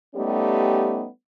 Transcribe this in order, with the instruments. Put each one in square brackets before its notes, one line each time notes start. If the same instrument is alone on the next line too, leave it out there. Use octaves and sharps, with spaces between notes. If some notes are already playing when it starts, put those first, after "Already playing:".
[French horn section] G3 A3 B3 C#4 D#4 G4